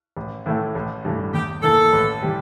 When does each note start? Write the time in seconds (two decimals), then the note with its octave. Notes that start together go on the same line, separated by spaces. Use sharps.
0.17 A1
0.46 A2 E3 A3 E4
0.75 A1
1.05 G2 E3 A3
1.33 E2 G4
1.63 E3 A#3 A4
1.93 A1
2.22 E3 G3